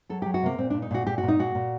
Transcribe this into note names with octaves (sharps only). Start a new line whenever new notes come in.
F#3 A4
F#3 G4
F#4
C3 A#3
A#2 C4
A#2 D4
D#4
A#2 F#4
A#2 G4
F#4
A#2
D#4
A#2 F#4
A#2